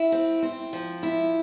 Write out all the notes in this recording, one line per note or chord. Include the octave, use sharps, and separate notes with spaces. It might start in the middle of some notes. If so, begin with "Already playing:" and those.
Already playing: E4
C4
C4
F3
E4